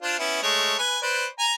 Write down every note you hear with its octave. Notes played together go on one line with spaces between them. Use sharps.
D4 F4 C5
B3 C#4 E4
G#3 A3 C#5
B4 G#5
B4 C5 D5
G#5 A#5